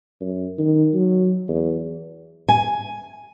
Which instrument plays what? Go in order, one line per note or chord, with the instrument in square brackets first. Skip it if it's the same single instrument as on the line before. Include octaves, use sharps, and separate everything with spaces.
[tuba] F#2
D#3
F#3
E2
[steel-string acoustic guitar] G#5